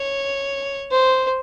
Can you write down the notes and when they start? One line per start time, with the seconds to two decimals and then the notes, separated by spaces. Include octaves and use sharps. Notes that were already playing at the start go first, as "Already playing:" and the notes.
Already playing: C#5
0.91 C5